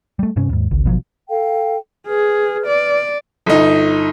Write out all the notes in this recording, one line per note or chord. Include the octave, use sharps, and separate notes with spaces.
G3 A3
G2 C3 C#4
D#2 G#2
G#1 C#2
B2 F3 F#3
A4 F5 G5
G#4 B4 F6
D5
G1 D#4